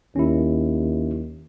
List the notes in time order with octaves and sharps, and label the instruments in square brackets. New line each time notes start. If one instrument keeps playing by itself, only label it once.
[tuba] D#2 [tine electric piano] C#4 E4